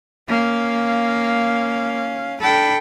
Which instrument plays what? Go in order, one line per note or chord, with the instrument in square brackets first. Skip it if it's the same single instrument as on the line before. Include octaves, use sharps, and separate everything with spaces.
[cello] A#3 [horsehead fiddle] C#4 F5
[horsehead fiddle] D4 B5 [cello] A4 G5